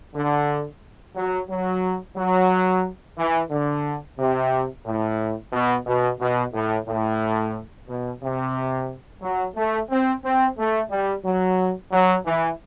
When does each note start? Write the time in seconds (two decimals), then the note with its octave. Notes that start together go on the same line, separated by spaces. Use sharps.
0.15 D3
1.16 F#3
1.49 F#3
2.16 F#3
3.18 E3
3.50 D3
4.18 C3
4.86 A2
5.53 B2
5.86 B2
6.20 B2
6.54 A2
6.87 A2
7.88 B2
8.23 C3
9.22 F#3
9.56 A3
9.90 C4
10.24 C4
10.58 A3
10.91 G3
11.25 F#3
11.92 F#3
12.26 E3